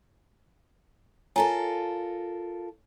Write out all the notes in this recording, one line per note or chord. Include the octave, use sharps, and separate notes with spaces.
F4 A4 A#4 C#5 G#5 A#5